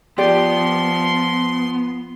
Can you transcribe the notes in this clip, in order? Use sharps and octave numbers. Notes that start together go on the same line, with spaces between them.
F3 B3 G4 D5 C6